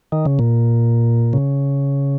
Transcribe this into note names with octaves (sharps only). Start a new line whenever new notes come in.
D#3
C#3
A#2
C#3